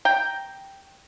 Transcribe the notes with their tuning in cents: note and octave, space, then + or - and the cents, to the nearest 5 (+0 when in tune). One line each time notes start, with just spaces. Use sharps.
G5 +0 A#5 +0